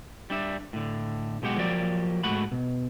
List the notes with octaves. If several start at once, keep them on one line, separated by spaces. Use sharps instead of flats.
G3 D4 E5
A2 D3
B1 B2 G#3 G4 F#5
F3 F#3 A#3 G4 D5
G#2 A3 F#4 F#5 B5
B2